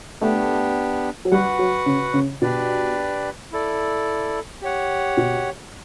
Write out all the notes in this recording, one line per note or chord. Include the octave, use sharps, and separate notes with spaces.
A3 B3 D4 G4
F#3
G3 F#4 B4 F#5
F#3
C#3
C#3
B2 D4 G4 B4 D5
E4 A4 D5
G4 C#5 F#5
B2